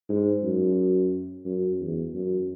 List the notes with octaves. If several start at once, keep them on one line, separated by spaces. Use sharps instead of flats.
G#2
F#2
F#2
E2
F#2